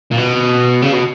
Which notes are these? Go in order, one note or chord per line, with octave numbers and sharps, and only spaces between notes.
A#2
B2
C#3
B2